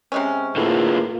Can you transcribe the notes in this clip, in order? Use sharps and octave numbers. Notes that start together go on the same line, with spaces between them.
C3 G#3 C#4
A2 D3 A#3 F4 G#4 B4